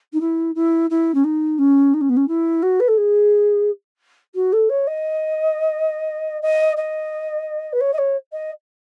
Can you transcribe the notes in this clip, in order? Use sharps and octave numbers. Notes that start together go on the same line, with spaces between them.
D#4
E4
E4
E4
C#4
D#4
C#4
D#4
C#4
B3
C#4
E4
F#4
B4
A4
G#4
F#4
A4
C#5
D#5
D#5
D#5
B4
C#5
D#5
C#5
D#5